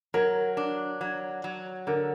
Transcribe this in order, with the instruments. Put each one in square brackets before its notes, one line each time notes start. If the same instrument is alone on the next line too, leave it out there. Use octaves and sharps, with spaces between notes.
[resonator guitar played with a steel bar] F#3 [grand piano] A#4
[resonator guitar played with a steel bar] D4
F#3
F#3
[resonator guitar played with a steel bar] D3 [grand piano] A#4